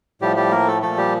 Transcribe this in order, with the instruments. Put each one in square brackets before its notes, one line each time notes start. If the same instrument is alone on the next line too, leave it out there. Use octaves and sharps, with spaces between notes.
[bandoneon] A2 F3 G3 G4
G3 G4
A#3 A#4
A3 A4
A#2 F3 A3 A4
G3 G4